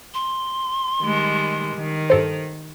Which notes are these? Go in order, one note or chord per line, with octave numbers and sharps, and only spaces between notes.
C6
D#3 G3 G#3
D#3
G2 A4 C5